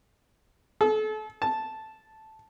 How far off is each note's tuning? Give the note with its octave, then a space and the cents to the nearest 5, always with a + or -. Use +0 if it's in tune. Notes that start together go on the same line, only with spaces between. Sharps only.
A4 -35
A5 -5